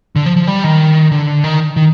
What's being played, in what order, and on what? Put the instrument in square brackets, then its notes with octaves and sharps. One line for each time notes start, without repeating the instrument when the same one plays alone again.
[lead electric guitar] D3
F3
F3
G3
D#3
D3
D#3
D#3